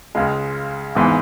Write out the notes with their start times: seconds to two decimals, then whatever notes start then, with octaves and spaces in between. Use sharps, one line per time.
0.15 C#2 C#3 G#3
0.95 G#1 G#2 E3 B3